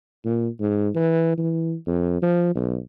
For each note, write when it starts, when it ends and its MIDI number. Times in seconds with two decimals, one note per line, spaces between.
0.25 0.48 46
0.60 0.89 44
0.95 1.33 52
1.38 1.75 52
1.87 2.18 41
2.22 2.52 53
2.55 2.77 35